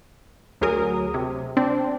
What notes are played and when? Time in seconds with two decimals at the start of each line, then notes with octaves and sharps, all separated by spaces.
0.61 D2 F#3 G#4 A#4 D#6
1.14 C3
1.57 C4 D4